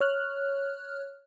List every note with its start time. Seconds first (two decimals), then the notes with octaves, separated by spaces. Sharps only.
0.01 C#5 F6 F#6